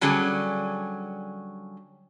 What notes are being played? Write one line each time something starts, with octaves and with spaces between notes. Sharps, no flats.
D3 F#3 G3 C#4 G#4